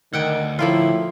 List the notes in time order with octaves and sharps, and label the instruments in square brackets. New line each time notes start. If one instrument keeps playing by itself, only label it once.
[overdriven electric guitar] D2 [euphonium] D#3 [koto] F#5 G5
[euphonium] A2 [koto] F3 A#3 F4 [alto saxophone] E4